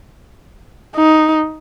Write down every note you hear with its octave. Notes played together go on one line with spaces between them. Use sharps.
D#4